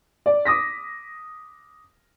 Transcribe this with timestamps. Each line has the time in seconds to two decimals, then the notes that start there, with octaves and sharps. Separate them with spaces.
0.26 D5
0.45 D6 D#6 A#6 B6